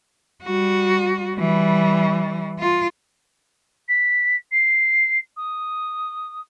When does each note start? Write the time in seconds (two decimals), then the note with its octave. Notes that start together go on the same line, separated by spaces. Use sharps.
0.43 G3 F#4
1.36 E3 G3
2.59 F4
3.88 B6
4.51 C7
5.36 D#6